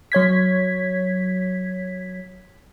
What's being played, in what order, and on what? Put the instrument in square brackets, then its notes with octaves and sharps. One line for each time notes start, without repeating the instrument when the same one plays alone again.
[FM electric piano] F#3 C#5 G#6 B6